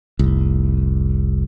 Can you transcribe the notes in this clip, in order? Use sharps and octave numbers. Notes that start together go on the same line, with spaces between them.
F1 C2